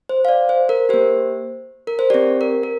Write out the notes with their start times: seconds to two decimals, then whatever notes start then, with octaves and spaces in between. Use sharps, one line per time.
0.09 C5
0.25 F5
0.29 D5
0.49 C5
0.69 A#4
0.89 A#3 G4 C5
1.87 A#4
1.99 C5
2.10 C4 G4 D5
2.41 A#4
2.63 A#4